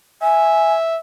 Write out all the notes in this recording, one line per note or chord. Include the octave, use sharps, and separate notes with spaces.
E5 G#5